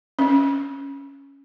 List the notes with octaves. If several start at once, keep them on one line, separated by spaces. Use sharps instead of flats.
C#4